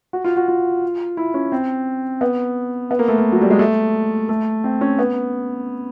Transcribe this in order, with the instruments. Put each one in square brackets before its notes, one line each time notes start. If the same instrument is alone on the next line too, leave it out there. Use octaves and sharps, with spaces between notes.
[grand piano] F#4
F4
F#4
F4
E4
C#4
C4
B3
B3
A#3
A3
A#3
F#3
G3
G#3
A3
A3
C4
C#4
B3